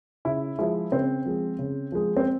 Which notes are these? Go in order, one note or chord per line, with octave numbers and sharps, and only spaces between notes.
C#3 E4
F3 G#3 E4
C#3 C4
F3 G#3
C#3
F3 G#3
C4